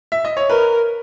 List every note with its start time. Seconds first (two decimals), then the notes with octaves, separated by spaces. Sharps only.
0.12 E5
0.25 D#5
0.37 C#5
0.50 A#4 B4